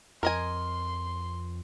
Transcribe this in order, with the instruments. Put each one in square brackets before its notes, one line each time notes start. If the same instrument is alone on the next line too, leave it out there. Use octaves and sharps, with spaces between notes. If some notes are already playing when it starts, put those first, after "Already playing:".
[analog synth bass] F2 [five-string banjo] A#4 D#5 G#5 [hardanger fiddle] C6